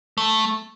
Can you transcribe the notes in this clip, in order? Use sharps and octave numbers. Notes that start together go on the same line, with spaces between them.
A3